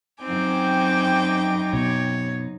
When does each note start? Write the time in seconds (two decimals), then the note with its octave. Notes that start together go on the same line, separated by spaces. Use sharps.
0.23 F#2 C4 D#4 G5 G#5 D6
1.73 B2 C#5